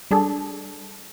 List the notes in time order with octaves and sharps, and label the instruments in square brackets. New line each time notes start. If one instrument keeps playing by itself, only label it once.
[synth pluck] G3 D4 G#4 A4